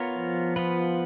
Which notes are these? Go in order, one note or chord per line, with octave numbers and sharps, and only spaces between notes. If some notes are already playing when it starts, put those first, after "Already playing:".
Already playing: B3 F4 A#4 C#5
F3
B3 F4 B4